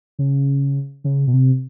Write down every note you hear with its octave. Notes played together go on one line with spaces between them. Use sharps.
C#3
C#3
B2
C3